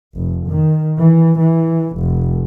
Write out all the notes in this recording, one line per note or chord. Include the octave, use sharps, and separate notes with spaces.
F1
D#3
E3
E3
F1